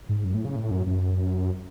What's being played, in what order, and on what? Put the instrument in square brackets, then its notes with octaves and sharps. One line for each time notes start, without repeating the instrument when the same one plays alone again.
[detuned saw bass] G#2
F#2
A2
C#3
A2
F#2
F#2